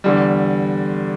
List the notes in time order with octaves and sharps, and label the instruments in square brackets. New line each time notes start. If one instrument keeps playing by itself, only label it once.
[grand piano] E2 D3 G3